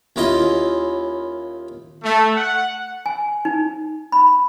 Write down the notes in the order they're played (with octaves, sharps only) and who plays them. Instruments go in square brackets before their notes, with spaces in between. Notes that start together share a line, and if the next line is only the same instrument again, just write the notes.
[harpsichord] D#2 C#4 E4 F4 D#5 C6
[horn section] A3
F#5
[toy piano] G#5
D#4
B5